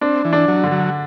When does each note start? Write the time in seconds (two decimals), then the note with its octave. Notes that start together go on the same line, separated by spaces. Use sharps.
0.01 C4 D4
0.25 E3
0.33 D4
0.48 F#3
0.64 D3
0.71 F#3